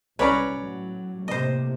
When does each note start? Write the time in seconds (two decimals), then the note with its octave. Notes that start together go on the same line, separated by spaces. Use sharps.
0.19 C2 C#4 B4 C#5 D5 A#5
0.54 A2 F#3
1.28 A2 C3 A#3 C5 D#5